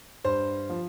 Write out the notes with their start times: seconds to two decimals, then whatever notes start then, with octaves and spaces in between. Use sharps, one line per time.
0.24 G2 C5
0.69 F3